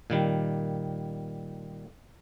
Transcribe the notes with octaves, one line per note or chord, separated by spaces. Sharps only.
A#2 D#3 G3